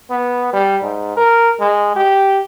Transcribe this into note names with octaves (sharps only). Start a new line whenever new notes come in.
B3
G3
G#2
A#4
G#3
G4